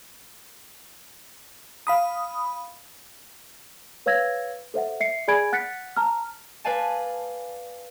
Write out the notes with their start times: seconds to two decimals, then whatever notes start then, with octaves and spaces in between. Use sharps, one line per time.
1.87 F5 B5 D#6
4.06 B4 C#5 F5 E6 G#6 A#6
4.74 A4 C5 E5 F#5
5.00 E5 C7 C#7
5.28 G#4 D5 G#5 B5 G#6 D7
5.52 F#5 F#6 A6 B6 C#7
5.97 A5 A#5 F6
6.65 B4 D5 F5 G#5 A5